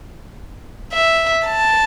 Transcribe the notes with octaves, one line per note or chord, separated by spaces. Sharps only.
E5
A5